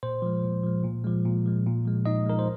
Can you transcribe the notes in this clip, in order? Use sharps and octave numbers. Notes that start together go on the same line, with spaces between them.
A#2 C5
F3 G#3
A#2
F3 G#3
A#2
F3 G#3
A#2
F3 G#3
A#2
F3 G#3
A#2 D#4 D#5
F3 G#3 A#4
C5